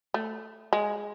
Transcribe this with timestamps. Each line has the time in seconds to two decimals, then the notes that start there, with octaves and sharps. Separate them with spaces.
0.14 A3
0.73 G#3